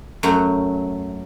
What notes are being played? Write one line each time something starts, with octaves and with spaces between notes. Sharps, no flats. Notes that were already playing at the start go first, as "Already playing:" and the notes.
F#2 F#3 A3 F#5